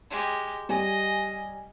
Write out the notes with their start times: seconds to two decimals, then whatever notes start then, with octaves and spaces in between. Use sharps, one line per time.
0.10 G#3 G4
0.69 G3 D#5 G#5